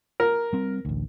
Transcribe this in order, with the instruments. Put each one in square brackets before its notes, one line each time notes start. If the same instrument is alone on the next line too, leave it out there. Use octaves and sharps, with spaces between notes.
[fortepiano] A#4
[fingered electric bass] G3 C4
A1 D2